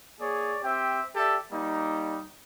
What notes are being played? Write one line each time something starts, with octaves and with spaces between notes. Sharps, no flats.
A#3 G#4 C#5 D5
C4 G4 E5 G5
G4 A4 D5 E5
G3 A#3 D#4